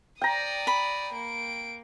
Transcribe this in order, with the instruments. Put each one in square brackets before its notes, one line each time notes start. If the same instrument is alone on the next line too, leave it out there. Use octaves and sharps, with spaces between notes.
[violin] D5 D#6 [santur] G5 A#5
[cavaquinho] B5
[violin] A#3 D7